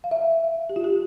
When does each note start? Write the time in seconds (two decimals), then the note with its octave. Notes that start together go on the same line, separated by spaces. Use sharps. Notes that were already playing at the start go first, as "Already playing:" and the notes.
0.04 F5
0.11 E5
0.69 G4
0.76 F4
0.84 G4